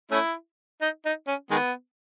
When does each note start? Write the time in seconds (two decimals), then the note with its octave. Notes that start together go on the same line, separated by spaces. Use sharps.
0.11 A3 C#4 E4
0.81 D#4
1.05 D#4
1.27 C#4
1.51 D#3 G#3 B3